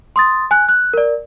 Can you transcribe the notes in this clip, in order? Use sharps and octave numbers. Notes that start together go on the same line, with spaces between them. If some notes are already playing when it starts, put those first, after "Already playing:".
C6 D#6 A6
G#5 F#6
F#6
A#4 D5